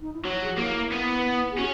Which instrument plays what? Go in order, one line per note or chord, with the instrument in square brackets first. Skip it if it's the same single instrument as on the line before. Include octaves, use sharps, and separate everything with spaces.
[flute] D#4
E4
[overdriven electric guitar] F#3 [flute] F#4
[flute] G#4
F#4
[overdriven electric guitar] A#3 [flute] E4
[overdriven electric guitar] B3
[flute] G#4
[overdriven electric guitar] C#4 [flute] F#4